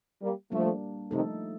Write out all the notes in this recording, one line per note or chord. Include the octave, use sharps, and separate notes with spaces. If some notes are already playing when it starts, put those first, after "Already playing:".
G3 A#3
F3 G3 A3 A#3 D4
C3 D#3 F3 A3 D#4 A4